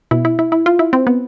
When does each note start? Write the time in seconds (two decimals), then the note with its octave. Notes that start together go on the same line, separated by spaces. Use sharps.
0.11 B2 E4
0.25 E4
0.39 E4
0.52 E4
0.66 F4
0.79 E4
0.93 C4
1.07 B3